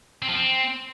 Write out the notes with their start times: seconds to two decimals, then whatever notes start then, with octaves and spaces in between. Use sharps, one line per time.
0.22 C4
0.28 F3
0.35 C4